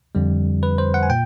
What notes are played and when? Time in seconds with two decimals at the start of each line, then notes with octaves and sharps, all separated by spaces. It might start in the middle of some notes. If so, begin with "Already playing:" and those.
0.15 F2 D3 G3
0.63 B4
0.78 C5
0.94 F#5
1.03 G#5
1.10 A#2 G5